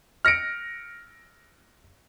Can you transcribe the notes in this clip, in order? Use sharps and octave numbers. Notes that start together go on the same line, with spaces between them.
F6 A#6 C#7 D7